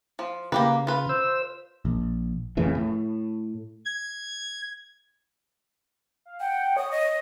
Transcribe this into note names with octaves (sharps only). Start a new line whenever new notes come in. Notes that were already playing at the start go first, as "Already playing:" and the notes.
F3
C#3 A#3 G4 B4
F4 B4
C5 E6
A#1
F2 A2 C#3 E3
A2
G#6
F5
F#5 G5
C#5 D#6
D#5